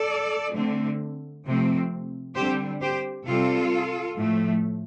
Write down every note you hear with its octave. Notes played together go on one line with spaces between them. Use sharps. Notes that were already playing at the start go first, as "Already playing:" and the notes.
Already playing: A4 D5
D3 A3 C4
C3 F3 A3 C4
D3 G3 C4 G4 C5
G4 C5
C3 G3 C4 F4 A4
A2 F3 A3